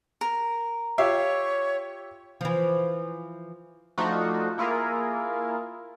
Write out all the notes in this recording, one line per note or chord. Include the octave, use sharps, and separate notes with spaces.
A#4
F4 G4 C#5 E5 F5
E3 F3
F3 A3 D4 D#4 F4 F#4
A#3 E4 F4 G#4 A#4